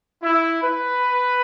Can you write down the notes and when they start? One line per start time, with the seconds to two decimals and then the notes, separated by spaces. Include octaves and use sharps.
0.22 E4
0.63 B4